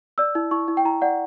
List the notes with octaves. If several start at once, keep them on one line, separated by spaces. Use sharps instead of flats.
D5 E6
E4
E4 C#6
E4
G5
E4 A#5
D5 F#5